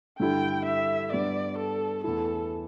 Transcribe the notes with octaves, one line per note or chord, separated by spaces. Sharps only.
G2 D3 G3 E4 A4 G5
E5
G2 G3 B3 D5
A4
E2 E3 A3 E4 A4